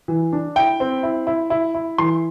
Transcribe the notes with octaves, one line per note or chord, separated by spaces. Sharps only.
E3
D4
E4 G5
C4
E4
E4
E4
E4
E3 C6